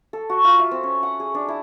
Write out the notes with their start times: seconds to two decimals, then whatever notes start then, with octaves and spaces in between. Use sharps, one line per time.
0.13 A4
0.30 F#4
0.44 F4
0.59 E5
0.71 C4
0.83 C#4
1.03 F#5
1.20 G#4
1.35 D4
1.48 E4